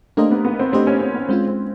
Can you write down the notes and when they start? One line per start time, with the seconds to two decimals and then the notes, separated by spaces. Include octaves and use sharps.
0.17 A3 A#3 D4 G4 C5 D#5
0.31 B3
0.45 B3
0.59 C4
0.73 A3 C4 D4 G4 C5 D#5
0.87 C#4
1.01 C4
1.14 B3
1.28 G#3 C4 C#4 F4
1.47 C4